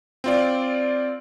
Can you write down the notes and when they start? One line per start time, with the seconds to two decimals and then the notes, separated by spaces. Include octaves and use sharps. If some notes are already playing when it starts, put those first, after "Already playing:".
0.24 C4 F4 D5